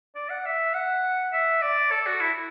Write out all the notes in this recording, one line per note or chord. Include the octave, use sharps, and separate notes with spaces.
D5
F#5
E5
F#5
E5
D5
A4
F#4
E4